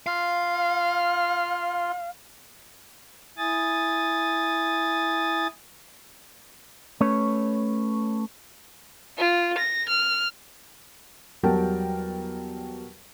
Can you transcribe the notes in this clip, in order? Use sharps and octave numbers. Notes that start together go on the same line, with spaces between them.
F4 F5
E4 G#5 D#6 A6
A3 C#4 B4 C#5
F4
A#6
F6
E2 F#3 G3 A#4 G5 A5